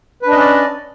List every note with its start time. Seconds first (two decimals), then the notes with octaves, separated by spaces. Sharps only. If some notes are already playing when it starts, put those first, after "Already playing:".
0.22 B4
0.27 D4
0.31 D#5
0.36 C#4
0.40 D5